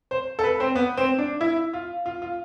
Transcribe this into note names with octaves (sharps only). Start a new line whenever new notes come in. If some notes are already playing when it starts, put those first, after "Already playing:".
C5
A4
B4
C4
B3
C4
D4
E4
F4
F4
F4